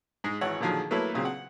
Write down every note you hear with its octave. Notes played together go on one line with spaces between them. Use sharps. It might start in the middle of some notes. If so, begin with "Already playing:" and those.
G#2 G#3 G#4
G#1 E3 C#5 F#5
A#2 D3 D#3 F3 F#3 G#4
F#3 A3 A#3 E4 B4 C#5
A#2 C#3 F#3 C4
F#5